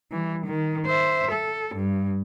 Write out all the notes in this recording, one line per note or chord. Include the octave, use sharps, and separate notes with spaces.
E3 G3
D#3
C5 E5
A4
G2